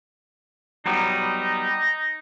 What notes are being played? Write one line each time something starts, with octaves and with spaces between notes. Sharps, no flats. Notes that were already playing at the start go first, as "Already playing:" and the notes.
F#3 G3 B3 D#4